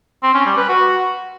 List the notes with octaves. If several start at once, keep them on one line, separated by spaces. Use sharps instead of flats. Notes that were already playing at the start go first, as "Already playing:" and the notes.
C4
C#4
G3
B4
F#4